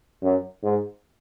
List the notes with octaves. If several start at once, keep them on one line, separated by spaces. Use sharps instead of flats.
F#2
G#2